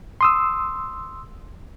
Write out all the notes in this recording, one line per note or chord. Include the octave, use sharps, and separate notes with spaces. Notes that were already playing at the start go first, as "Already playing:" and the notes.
C6 D#6 E6